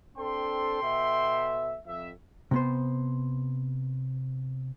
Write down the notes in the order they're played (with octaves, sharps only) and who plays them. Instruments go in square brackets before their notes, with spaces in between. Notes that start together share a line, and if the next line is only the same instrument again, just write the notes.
[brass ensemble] C4 D4 A4 [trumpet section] G5 C6
[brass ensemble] B2 A4 E5
[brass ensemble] F2 [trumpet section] E5
[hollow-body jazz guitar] C3 B3 C5